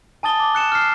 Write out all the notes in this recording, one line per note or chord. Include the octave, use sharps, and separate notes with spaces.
G#5 A5 D#6 A6 G7
D6
F#6 C#7 E7
F6 C7